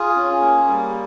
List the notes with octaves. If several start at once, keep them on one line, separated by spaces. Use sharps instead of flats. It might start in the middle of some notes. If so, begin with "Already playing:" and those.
Already playing: F4 G#4
C#4
A#3
G3